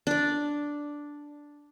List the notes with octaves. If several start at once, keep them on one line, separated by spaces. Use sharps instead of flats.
D4 D5